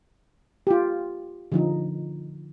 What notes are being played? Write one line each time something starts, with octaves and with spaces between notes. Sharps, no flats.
F4 G4
D3 F3 D#4